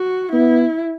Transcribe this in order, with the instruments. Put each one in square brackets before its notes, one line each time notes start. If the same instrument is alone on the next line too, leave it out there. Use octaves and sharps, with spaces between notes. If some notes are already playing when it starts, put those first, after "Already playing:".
Already playing: [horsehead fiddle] F#4
[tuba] B3 [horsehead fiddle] E4